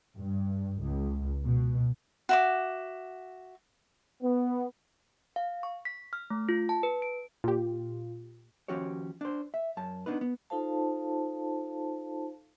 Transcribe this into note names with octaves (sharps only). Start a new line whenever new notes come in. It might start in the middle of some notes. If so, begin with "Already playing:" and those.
G2
C#2
B2
F#4 E5 D6
B3
F5
C#6
B6
F6
A3
F4
A5
B4
D7
A#2 F4 G4
D#2 F3 C#4 F#4 G4 C#5
D4 C5
E5
F#2 A5
B3 D4 D#4 B4
B3
D#4 F4 A4 C5 F5 A5